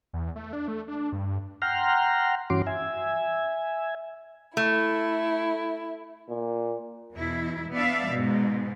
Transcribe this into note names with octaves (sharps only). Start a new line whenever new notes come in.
E2
A3
D4
A3
D4
G2
F#5 G5 A#5 C6 F6
G2 E3 C#4 F#4 C6 D6
E5 G#5
A3 E4
A#2
E2 B2 E4
B3 D4 D5 E5 F5
G#2 B2